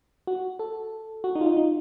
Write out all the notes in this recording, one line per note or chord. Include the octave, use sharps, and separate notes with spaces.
F#4
A4
F#4
D#4
F4
D#4
D#4